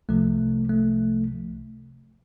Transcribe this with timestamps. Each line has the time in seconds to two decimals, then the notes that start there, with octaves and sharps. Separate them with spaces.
0.09 C2 C3 F3 A3
0.69 A3